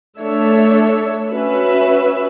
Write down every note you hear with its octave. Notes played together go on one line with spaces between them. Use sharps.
A3 D4 A4 C#5 E5
C#4 F#4 B4 E5